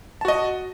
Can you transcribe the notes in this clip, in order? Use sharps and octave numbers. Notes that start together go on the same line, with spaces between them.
F#4 D#5 A5